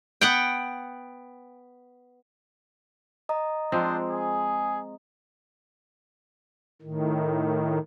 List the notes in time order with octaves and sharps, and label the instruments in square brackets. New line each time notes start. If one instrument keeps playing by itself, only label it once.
[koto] B3 F#5 G5
[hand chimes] D#5 A#5 D#6
[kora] F3 G#3 C4 [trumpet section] D4 D#4 C5
[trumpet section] G#4
[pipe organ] A2 D#3